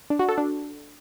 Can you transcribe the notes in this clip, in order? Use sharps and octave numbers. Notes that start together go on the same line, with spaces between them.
D4
F#4
A4
D4